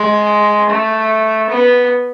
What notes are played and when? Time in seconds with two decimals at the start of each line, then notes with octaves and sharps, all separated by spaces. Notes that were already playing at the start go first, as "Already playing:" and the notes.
Already playing: G#3
0.70 A3
1.50 B3